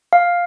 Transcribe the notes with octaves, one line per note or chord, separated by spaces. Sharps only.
F5